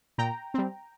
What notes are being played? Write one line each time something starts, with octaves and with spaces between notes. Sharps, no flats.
A#2 G5 A#5
G3 C4